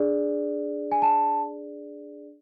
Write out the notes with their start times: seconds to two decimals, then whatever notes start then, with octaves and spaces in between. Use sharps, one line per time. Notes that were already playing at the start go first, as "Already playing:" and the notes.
Already playing: D4 G#4 D5
0.92 G#5
1.02 A5